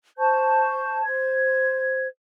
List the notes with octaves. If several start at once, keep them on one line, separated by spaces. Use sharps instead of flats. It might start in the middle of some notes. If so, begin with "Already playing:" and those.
C5 A5 C#6 G6
C5 G#6